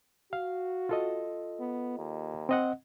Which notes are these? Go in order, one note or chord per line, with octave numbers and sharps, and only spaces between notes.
F#4 F5
F4 A4 D#5
B3
D#2
C4 D#5 F#5